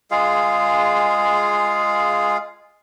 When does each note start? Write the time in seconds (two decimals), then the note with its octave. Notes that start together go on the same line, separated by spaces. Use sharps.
0.11 G#3 F4 G#4 F5